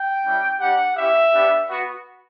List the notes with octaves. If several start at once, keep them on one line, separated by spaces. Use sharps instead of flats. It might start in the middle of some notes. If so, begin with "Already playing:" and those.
Already playing: G5
G3 C#4 E4 G4
G3 D4 G4 F#5
C#4 E4 G4 E5
B3 D4 G4
B3 F#4